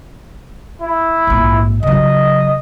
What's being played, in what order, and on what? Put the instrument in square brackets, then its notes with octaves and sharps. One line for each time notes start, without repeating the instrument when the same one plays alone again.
[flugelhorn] E4
[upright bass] A#1 G#2
[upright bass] C#3 F#3 [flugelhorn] D#5